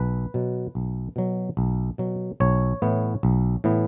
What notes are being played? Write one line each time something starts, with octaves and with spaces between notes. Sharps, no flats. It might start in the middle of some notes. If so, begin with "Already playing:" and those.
Already playing: B1 B4
B2 F#3
B1
B2 F#3
B1
B2 F#3
B1 C#5
A2 E3 B3
B1
A2 E3 B3